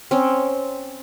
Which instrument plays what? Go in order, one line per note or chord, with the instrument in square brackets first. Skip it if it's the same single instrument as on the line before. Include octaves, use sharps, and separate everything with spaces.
[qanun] C4 C#4